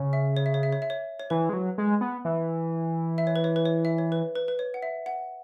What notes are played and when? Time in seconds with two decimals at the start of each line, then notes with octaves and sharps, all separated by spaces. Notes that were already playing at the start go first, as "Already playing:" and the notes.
Already playing: C#3
0.13 E5
0.37 C#5
0.46 E5
0.54 C#5
0.63 E5
0.72 C#5
0.82 E5
0.90 C#5
1.20 C#5
1.30 E3 B4
1.49 G#3
1.53 F#3
1.78 G#3
2.01 B3
2.25 E3
3.18 E5
3.27 C#5
3.36 B4
3.44 C#5
3.56 B4
3.66 C#5
3.85 E5
3.98 C#5
4.12 B4
4.35 B4
4.48 B4
4.59 C#5
4.74 F#5
4.82 E5
5.06 F#5